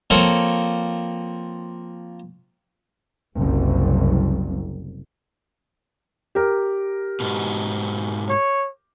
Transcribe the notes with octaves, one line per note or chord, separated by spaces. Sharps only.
F3 A#3 C4 F4 A4 C#5
F#1 C2
G4 A#4
G#2 B2
C#5